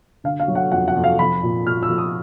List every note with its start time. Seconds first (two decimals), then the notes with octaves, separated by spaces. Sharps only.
0.24 D3 F5
0.40 F5
0.48 F#3
0.55 F#5
0.72 F2 F#5
0.88 F#5
0.96 F2
1.04 F5
1.19 F3 B5
1.43 A#2
1.66 A#2 F6
1.83 E6
1.89 F3
1.98 D#6